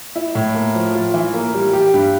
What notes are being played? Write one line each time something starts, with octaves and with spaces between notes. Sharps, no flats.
E4
A2
A#3
F3
F4
E3
A#3
G3
G4
G2